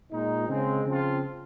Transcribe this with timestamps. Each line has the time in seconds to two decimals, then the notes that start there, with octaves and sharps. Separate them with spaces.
0.12 A#2 G#3 D#4
0.49 C#3 G#3 C4
0.87 C#3 F3 C4 F4